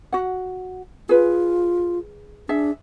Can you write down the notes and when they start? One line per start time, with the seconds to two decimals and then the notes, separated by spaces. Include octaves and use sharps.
0.12 F#4 F#5
1.09 F4 G#4 B4
2.49 D4 G#4 E5